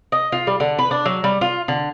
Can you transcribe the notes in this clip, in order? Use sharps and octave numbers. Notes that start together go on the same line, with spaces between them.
D#5
F4
G3
D3
B4
D4
F#3
G3
F4
D3